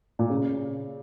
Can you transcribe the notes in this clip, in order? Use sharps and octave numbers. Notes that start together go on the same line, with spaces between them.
A#2
C#3